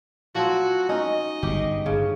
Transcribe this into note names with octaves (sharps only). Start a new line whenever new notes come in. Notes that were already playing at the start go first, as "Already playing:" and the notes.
F3 F#3 C4 F#4
C#4 D#4 D#5
G1 G#2 G4
G1 C#3